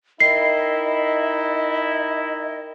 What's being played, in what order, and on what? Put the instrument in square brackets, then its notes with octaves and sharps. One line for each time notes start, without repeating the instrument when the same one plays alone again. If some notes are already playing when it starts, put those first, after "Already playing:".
[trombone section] D#4 E4 [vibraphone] A#4 G5 [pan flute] D#5 [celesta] C7